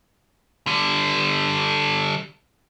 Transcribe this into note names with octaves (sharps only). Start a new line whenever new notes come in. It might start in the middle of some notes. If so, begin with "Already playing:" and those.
D3 G3